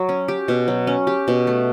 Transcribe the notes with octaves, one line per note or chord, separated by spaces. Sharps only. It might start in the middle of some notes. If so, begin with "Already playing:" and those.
Already playing: F#3
C#4
G4
B2
F#3
C#4
G4
B2
A3